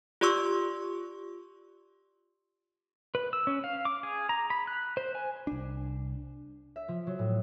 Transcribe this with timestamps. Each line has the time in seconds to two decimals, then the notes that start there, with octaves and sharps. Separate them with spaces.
0.21 F4 G4 D5 C6 C#6 E6
3.15 B4
3.33 E6
3.47 C#4
3.64 F5
3.85 D6
4.03 G#4
4.29 A#5
4.50 B5
4.67 F#6
4.97 C5
5.15 G#5
5.47 C2 D4
6.76 E5
6.88 F3
7.07 F#3
7.19 A2